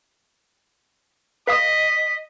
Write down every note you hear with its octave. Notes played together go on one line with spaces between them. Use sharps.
B4 D#5 F5 D#6 B6